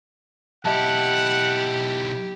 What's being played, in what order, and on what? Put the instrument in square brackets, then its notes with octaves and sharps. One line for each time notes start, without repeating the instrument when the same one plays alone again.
[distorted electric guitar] B1 E4 [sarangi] G4 [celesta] D#5 E5 A5 [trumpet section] F#5